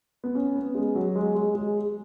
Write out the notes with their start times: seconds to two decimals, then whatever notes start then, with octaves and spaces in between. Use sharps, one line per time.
0.24 B3
0.35 C#4
0.56 B3
0.75 G#3
0.95 F#3
1.15 G#3
1.35 G#3
1.55 G#3